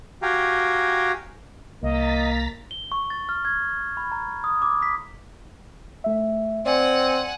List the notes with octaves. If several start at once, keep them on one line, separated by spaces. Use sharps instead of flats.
F#4 G4 F5 G5 G#5 A#5
C2 A#3 D#5 A#5 A6 B6
G7
C#6
A6
F6
G#6
B5
A#5
D#6
D6
B6
A3 E5
C4 D5 F#5 G#5